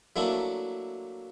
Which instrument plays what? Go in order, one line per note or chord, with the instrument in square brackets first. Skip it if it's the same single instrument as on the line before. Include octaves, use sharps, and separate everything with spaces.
[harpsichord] F#3 A3 A#3 D4 E4